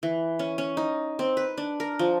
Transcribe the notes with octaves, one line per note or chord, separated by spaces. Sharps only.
E3
C#4
C#4
D#4
C4
B4
D4
A#4
F3